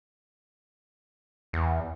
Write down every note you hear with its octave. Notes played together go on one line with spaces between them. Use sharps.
E2